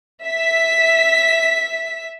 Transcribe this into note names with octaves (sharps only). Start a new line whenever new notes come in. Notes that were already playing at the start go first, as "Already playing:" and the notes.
E5 B6